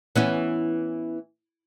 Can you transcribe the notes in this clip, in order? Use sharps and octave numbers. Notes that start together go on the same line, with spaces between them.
E3 B3 C#4